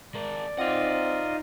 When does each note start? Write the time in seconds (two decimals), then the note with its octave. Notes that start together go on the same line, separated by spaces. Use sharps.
0.15 G#3 A#4 D5
0.59 C4 D#4 F4 D#5 F#5